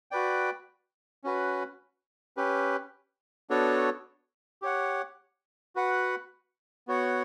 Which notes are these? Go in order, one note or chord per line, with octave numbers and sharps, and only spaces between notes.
F#4 B4 D5 G5
C#4 F#4 B4
C#4 G4 B4
B3 D4 F#4 A4 C#5
G4 C#5 F#5
F#4 B4 F#5
B3 F#4 C#5 F#5